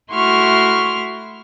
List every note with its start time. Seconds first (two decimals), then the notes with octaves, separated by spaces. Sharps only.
0.12 A3 E4 F#4 C6 C#6 F6